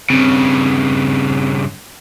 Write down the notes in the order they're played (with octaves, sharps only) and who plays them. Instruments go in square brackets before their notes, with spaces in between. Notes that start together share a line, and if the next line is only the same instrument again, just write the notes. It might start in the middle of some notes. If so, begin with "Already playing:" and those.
[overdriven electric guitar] G2 C#3 [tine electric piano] C4